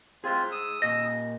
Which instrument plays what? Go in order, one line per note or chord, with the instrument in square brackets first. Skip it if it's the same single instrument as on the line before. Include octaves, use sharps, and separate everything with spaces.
[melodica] C4 F4 [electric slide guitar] G#4 C5
[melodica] D#6 E6
[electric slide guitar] A#2 D#5 [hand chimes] A#6